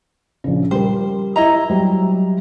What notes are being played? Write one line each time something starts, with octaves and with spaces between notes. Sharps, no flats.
A#1 C#3
G3 A#4 C5
E4 D#5 A#5
F#3 G3